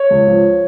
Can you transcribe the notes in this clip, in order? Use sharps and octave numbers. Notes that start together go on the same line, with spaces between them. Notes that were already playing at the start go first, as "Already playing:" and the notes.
Already playing: C#5
C#2
F3